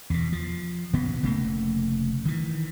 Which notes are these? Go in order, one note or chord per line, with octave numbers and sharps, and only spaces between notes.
E2 B2
F3
D#1 G2 C#3 B3
F1 C#3 A3 A#3
D#3 E3